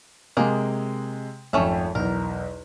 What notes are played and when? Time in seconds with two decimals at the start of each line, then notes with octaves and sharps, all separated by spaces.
0.37 C3 G#3 A#3 G#4
1.53 G#1 F2 A3 C#4 E5
1.95 B1 E2 A#4